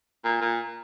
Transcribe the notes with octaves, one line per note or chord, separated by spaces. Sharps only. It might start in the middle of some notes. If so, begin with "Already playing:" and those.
A#2
A#2